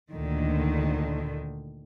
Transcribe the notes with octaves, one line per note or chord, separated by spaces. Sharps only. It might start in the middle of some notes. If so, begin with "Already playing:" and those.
D2 A#2 D3 D#3